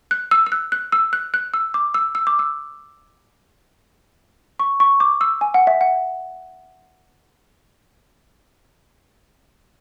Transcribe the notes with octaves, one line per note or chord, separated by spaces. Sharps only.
F#6
E6
E6
F#6
F#6
E6
F#6
F#6
E6
D6
E6
E6
D6
E6
C#6
C#6
D6
E6
G#5
F#5
E5
F#5